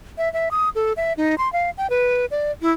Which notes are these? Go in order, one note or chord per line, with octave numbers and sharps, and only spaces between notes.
E5
E5
D#6
A4
E5
D#4
C6
F5
G5
B4
D5
E4